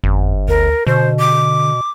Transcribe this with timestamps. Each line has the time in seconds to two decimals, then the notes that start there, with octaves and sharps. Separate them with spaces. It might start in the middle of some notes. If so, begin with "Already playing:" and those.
0.04 G1 F2
0.48 D2 A#4
0.87 B2 D3 C5
1.19 D6